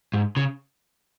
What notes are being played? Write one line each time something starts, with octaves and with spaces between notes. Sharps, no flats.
G#2
C#3